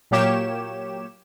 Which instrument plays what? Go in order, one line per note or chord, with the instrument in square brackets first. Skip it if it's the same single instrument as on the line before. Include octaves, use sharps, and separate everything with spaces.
[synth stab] A#2 F#3 A#3 G4 C#5 E7